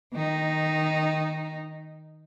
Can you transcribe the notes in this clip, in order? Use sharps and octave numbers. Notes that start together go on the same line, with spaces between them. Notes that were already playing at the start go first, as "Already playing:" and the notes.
D#3 D#4